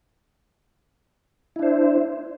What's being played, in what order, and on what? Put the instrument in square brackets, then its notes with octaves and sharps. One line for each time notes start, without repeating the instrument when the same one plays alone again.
[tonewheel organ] E4
D4
C5